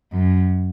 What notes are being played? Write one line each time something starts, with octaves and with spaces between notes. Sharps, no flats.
F#2